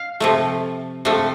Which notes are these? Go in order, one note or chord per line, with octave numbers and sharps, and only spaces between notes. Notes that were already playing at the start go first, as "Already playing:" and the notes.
Already playing: F5
C3 F3 A3
C3 F3 A3